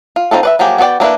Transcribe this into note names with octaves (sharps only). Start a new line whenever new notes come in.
F4
C4 D#4 F4 A4
B4 D5 E5
F3 F#3 A#3 G4 G#4
B3 F#4 G#4 D5 G5
G3 A#3 D4 E4 B4